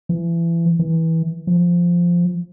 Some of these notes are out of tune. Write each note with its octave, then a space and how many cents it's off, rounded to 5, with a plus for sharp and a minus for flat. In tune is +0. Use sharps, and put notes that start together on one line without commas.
E3 +30
E3 -20
F3 -5